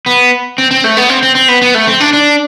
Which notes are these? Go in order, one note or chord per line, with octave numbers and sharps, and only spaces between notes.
B3
C4
C4
A3
B3
C4
C4
C4
B3
B3
A3
C4
D4
D4